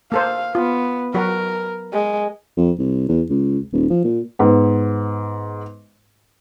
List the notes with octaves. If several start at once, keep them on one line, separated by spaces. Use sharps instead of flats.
A#3 A4 C5 F5
B3 F4
F#3 F#4 A#4 B4
G#3
F2
C2
E2
C#2
D#1
F3
A#2
G#2 B3